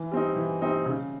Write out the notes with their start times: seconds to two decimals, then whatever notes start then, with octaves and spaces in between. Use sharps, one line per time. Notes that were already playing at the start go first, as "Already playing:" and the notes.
Already playing: E3
0.11 G3 C4 D#4
0.36 E3
0.61 G3 C4 D#4
0.86 C#3